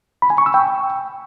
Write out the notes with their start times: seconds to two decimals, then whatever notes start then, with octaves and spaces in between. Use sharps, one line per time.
0.22 B5
0.30 G#5
0.38 C#6
0.46 E6
0.54 G5